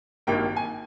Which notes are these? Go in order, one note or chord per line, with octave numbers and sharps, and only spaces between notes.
G#1 G2 D#3 A#3 G5
G#5